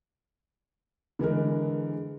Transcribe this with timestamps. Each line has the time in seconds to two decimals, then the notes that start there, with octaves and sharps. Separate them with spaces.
1.19 D3 E3 G#3 A#4